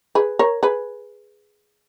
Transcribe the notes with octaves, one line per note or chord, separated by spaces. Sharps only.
G#4 B4
A#4 C#5
G#4 B4